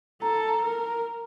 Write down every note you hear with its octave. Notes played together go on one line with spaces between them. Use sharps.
A4 A#5
A5
A#5
A#4